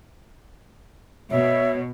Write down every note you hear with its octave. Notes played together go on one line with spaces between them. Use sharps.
B2 C#5 E5